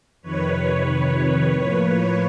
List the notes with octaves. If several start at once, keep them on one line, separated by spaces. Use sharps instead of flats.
F2 C3 D#3 B4 C#5
A2 F3 A#3